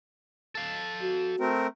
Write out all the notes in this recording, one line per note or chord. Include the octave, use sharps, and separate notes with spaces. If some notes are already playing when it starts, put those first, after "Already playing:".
A4 F5
F#4
A3 C4 A#4